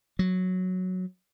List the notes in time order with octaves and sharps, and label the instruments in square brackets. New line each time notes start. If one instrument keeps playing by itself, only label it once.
[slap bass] F#3